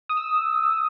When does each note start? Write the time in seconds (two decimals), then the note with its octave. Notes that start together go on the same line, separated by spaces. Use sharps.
0.09 D#6
0.17 E6